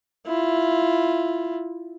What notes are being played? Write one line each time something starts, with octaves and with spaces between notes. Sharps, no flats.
E4 F4